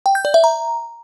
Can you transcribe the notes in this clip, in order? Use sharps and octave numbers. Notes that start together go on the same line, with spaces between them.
G5
G6
D5
E5
A#5